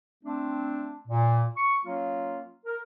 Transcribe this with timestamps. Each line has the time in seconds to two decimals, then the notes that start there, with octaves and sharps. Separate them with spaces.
0.24 A3 C4 D4
1.08 A#2
1.57 C#6
1.86 F#3 A#3 C#4 F4
2.66 A#4